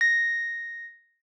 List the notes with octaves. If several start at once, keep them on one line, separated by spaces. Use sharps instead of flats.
A#6